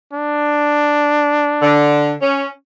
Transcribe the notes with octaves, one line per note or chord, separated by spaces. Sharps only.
D4
D3
C#4